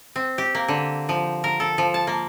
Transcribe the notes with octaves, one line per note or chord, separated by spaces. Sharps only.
C4
G4
A#3
D3
F3
A#4
A4
F3
A5
A#3